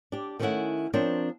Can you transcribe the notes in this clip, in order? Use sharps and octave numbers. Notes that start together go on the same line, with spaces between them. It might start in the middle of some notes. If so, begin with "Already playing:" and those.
D4 G4
D#3 F#3 A3 C#4 E4 F#5
F3 C4 D4 A#4 C#5